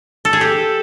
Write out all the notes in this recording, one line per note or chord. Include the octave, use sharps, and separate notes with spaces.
A4
G#4
G4 A4